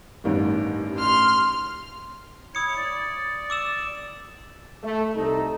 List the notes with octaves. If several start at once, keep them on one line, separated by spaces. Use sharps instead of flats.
A1 G2 D#3
C6 F6
E4 C#5 D#6 C#7
D5
D6 E6 E7
A3
C2 D#4 A4